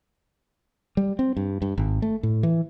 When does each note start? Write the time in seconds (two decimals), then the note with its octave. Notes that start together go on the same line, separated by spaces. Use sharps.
0.97 G3
1.19 C4
1.37 G2
1.62 G2
1.78 G#1
2.02 A3
2.23 A2
2.43 E3